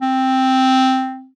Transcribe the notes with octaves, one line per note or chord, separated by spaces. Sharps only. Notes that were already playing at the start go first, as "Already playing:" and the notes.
C4